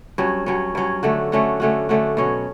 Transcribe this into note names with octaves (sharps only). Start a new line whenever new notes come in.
G2 F#3 C#4
G2 F#3 C#4
G2 F#3 C#4
D3 A3 C#4 F#4
D3 A3 C#4 F#4
D3 A3 C#4 F#4
D3 A3 C#4 F#4
B2 F#3 C#4